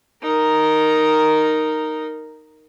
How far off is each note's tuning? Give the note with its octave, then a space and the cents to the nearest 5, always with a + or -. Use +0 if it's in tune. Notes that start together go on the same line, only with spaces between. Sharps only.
D#4 +0 A#4 +0